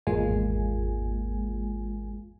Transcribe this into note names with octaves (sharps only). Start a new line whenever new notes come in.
G#1 E2 G#3 A#3 F4 G#5